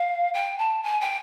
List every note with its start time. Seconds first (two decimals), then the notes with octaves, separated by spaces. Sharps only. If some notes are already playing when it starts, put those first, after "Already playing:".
Already playing: F5
0.33 G5
0.58 A5
0.83 G#5
1.00 G5